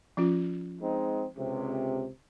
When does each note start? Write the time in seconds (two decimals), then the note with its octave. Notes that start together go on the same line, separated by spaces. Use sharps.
0.17 F3 C#4 F4
0.82 G#3 C4 D#4
1.38 C#2 C3